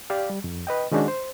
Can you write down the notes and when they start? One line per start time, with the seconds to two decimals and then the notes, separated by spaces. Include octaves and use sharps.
0.10 G4 D5 F5
0.30 G3
0.44 F2
0.67 B4 D#5 G5
0.92 D#3 G#3 C#4 D4 F#4
1.08 C5